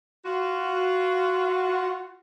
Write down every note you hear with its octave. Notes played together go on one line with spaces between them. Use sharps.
F4 F#4